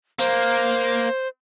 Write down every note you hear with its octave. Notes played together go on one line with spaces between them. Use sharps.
A#3 C5